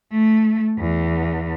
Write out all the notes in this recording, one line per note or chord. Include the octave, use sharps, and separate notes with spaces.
A3
E2